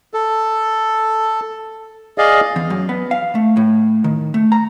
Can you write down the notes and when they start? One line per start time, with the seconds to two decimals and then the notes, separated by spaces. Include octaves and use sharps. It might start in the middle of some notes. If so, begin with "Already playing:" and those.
0.14 A4
2.18 G#4 D5 D#5 F5
2.56 E2
2.70 F#2
2.89 B3
3.11 F5
3.35 A3
3.57 A2
4.04 D#3
4.34 A3
4.52 A#5